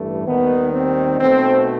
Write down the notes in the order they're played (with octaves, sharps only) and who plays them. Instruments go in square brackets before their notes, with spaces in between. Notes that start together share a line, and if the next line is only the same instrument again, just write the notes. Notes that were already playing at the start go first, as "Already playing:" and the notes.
Already playing: [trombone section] A1 G2 E3 A3
D#2 D#3 G3 B3
C4
B1 B2 A3 C4